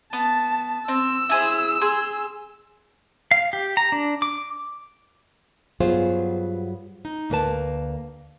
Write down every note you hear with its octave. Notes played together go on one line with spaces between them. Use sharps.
B3 A5
C4 E6
E4 G#4 C5
G#4 C6
F5
G4
A#5
D4
D6
G2 F#3 B3 F4 G#4 C5
D#4
D2 A#3 A#4 B4 A5